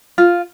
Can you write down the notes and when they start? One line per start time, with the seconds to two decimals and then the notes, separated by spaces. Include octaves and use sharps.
0.18 F4